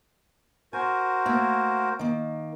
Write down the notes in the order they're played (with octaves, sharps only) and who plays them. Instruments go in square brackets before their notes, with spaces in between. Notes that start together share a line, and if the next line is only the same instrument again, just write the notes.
[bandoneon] F#4 A#4 C5 [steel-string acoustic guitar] G#5
[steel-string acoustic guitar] A3 A#3
D#3 A#3